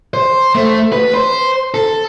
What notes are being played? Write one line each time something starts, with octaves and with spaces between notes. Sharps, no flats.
C5
A3
B4
C5
A4